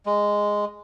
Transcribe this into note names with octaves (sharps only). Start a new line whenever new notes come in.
G#3